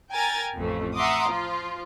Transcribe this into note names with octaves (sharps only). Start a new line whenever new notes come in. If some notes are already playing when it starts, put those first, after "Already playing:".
A#4 G5 G#5 A#5 G#6 A6
A1 F2 A3
E5 F#5 A#5 C6 D6 D#6
F3 F4